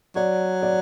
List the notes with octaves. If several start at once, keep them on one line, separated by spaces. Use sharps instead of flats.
F#3 D5
D5